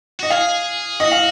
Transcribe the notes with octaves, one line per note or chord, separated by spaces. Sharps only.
F#4 D#5
G#4 F5
F#4 D#5
F5